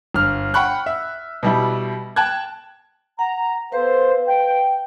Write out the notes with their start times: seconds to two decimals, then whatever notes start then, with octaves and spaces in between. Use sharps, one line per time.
0.14 G1 F6
0.54 F#5 G5 B5 C#6 F#6
0.86 E5
1.43 B2 G3 E4
2.16 G5 A5 F#6 G#6
3.19 F#5 A#5
3.72 B3 A4 B4 C5 F5
4.27 G5